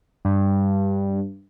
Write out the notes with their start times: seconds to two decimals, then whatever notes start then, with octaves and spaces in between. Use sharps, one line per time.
0.25 G2